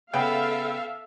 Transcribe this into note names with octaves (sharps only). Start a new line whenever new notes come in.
C#3 B3 A4 E5 F5 G5